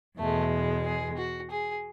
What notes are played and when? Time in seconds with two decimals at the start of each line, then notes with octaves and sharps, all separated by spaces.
0.18 E2 B2 G#3 A3
0.85 G#4
1.17 F#4
1.51 G#4